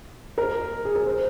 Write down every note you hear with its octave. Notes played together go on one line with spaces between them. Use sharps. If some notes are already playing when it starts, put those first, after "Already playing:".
A#4
G#4
A#4
C5